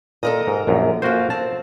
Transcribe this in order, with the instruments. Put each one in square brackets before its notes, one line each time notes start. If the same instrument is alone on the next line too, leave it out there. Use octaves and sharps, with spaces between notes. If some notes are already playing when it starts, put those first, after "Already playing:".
[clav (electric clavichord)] A#2 [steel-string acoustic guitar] A4 A#4 D#5
[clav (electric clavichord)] G#2
A#1 F#2
[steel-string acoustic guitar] A#3 F4 [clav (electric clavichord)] C#4 F#4 C5
[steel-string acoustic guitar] C4 [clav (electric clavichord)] A5